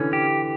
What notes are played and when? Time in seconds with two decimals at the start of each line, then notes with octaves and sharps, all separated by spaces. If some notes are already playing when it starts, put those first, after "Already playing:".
Already playing: D3 E3 C#4
0.13 G4